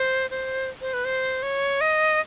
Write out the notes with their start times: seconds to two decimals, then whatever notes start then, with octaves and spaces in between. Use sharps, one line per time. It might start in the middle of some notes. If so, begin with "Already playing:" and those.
Already playing: C5
0.31 C5
0.81 C5
0.94 B4
1.05 C5
1.43 C#5
1.81 D#5